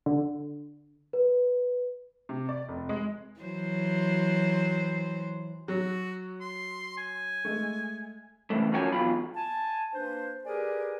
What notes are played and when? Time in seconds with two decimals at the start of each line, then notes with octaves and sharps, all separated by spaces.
0.06 D3
1.13 B4
2.29 C3
2.49 D5
2.69 F1
2.89 G#3
3.40 E3 F#3 C5
5.68 F#3 F#4
6.41 C6
6.98 G#5
7.45 G#3 A3
8.50 C#3 E3 G#3 A3
8.72 F#2 F3 C#4 F#4 G#4 G#5
8.92 E2 B2 F#3 F4 B5
9.35 G#5 A5
9.93 A#3 D4 B4 C5
10.45 G4 G#4 A#4 B4 D5 G#5